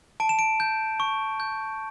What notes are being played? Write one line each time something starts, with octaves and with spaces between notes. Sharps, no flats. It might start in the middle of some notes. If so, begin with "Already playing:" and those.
A5 D7
E7
D7
G6
C#6
G6